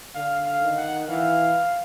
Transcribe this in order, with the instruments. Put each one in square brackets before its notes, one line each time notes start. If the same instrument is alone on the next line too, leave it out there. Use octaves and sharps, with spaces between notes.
[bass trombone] D3 [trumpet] F5
[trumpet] F5
[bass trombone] D#3
[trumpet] F#5
[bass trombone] E3 [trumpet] F5